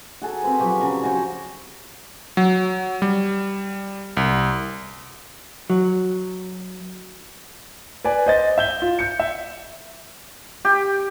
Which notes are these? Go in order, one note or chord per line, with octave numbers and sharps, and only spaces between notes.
F#4 G#4 A4 A#5
C4 B4 C5
F3 F#3 G4 C#6
C#3 A#5 C#6
F#4 C5 C#5 G5
F#3
G3
C2
F#3
B4 D5 G#5
C5 D#5 A6
E5 G6 G7
F4
G6 C#7
E5
G4